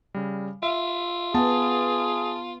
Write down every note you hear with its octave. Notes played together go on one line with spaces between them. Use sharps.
C#3 G3
F4 E5
B3 G#4 A5